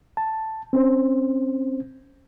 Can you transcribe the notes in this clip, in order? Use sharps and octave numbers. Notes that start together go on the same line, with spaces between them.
A5
C4 C#4 C5